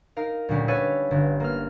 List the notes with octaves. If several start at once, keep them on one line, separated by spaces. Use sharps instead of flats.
D#4 A#4 F5
D2 A#2 G3 C#4
B4 C#5 F5 E6 A6 D#7
G1
A#3 F6